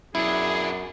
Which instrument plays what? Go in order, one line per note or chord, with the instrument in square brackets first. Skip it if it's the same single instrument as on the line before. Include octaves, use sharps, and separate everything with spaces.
[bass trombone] F#2 [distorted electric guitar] B2 D4 [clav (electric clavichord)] E4 [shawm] G#4